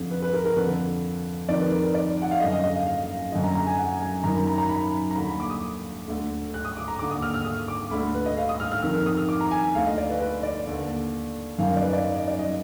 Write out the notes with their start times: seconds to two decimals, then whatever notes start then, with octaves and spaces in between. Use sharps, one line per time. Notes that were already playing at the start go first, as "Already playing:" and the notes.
Already playing: F2 D3
0.11 B4
0.22 B4
0.33 A#4
0.45 A#4
0.56 F2 D3 B4
1.48 F2 D#3 D5
1.60 B4
1.71 A#4
1.83 B4
1.94 D5
2.22 F#5
2.31 F5
2.40 F#2 D3 D#5
2.52 D#5
2.63 D#5
2.75 F5
2.86 F5
3.32 F#2 D3 D#5
3.44 A#5
3.55 A#5
3.67 G#5
3.78 F#5
4.01 G#5
4.24 F#2 D#3 A#5
4.35 B5
4.47 A#5
4.58 A#5
4.69 B5
5.11 A#5
5.16 D#2 D3 B5
5.27 B5
5.40 D6
5.50 D#6
6.08 D2 D3
6.54 F#6
6.65 D#6
6.77 D6
6.88 A#5
6.99 D#2 D3 D6
7.11 D#6
7.22 F6
7.34 F6
7.45 D#6
7.68 D6
7.91 D2 D3 B5
8.14 B4
8.26 D#5
8.37 F5
8.49 D#6
8.60 F6
8.72 F6
8.83 F2 D#3 F6
8.95 F6
9.06 D#6
9.17 F6
9.29 D6
9.41 A#5
9.51 G#5
9.75 D2 F5
9.78 D3
9.86 D#5
9.98 D5
10.10 B4
10.21 B4
10.43 D5
10.67 D#2 D3
11.58 F#2 D#3 F5
11.70 F5
11.77 D5
11.82 B4
11.93 D5
12.05 D#5
12.16 D#5
12.28 D5
12.39 D#5